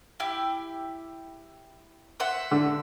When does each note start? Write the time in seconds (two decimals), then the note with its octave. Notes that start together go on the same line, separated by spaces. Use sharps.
0.20 E4 G4
2.20 C5 E5 F#5
2.51 D3